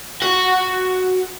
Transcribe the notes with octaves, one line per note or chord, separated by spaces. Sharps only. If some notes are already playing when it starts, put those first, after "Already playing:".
F#4 F#5